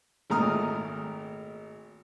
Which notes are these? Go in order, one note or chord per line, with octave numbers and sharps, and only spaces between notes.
G#1 A#2 A3 A#5 D#6 F6